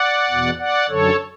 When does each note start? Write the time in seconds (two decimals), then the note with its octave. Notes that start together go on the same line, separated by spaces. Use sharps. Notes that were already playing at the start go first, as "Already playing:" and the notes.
Already playing: D5 F#5
0.30 E2 B2
0.59 D5 F#5
0.89 F#2 D3 A4 C#5